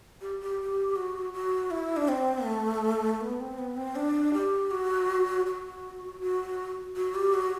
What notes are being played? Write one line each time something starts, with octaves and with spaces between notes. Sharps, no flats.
G4
G4
G4
F#4
F#4
E4
D4
C4
A3
B3
C4
B3
C4
D4
G4
F#4
F#4
F#4
F#4
G4
F#4